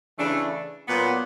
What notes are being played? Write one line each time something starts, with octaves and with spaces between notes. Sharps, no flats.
C#3 E3 A3 D4
A#2 F#3 B3